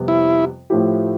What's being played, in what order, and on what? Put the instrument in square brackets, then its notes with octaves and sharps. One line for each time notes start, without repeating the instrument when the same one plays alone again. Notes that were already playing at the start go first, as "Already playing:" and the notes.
Already playing: [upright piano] F2 C3 G3 B3
[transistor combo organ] E4
[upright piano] A2 F3 A3 E4 G4